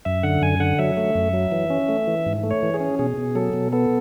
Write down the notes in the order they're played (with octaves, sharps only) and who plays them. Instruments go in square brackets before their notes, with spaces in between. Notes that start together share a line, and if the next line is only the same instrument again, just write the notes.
[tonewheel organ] F#2 E5
D3 F#5
F#2 G#5
D3 F#5
F#3 E5
A3
F#2
F#3
E3
C#4
A3
E3
G#2
A3
C#5
E3
G#4
C#4
B2 G#4
B2
F#3 A4
B2
B3 A4